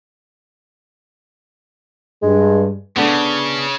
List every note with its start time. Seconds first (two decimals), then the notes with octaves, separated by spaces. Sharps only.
2.23 G2 G#3
2.97 C#3 B3 D4 A4